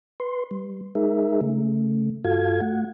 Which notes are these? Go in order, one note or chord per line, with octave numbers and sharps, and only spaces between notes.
B4 C6
G3
G#3 D#4 G#4 A#4 E5
C#3 A3
G2 F4 F#4 A4 F5 G#6
A3 F#5